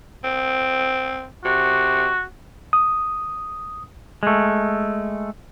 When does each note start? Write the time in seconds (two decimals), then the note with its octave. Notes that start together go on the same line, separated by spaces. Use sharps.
0.24 C4
1.45 C3 F#4
2.73 D#6
4.23 G#3 A3